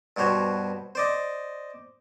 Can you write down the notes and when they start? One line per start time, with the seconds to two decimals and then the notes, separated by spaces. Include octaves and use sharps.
0.17 G2 B2 F#4 C5 C#5
0.95 C5 D5 D#5